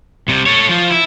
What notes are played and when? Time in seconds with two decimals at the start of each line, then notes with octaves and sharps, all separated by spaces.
0.28 C2 C3
0.46 A4 C#5
0.69 F3 F4
0.91 E4